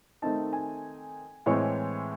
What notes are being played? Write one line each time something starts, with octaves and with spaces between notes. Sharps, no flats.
D#3 A3 C4 D#4 A5
G#5
A2 E3 G#3 C4 C#5